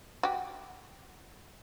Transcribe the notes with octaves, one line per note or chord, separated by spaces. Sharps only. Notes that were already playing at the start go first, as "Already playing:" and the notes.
F#4 G4